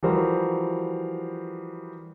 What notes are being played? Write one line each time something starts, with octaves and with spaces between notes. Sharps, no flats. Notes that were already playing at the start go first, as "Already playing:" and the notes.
E3 F3 G3 F#4 A#4 C5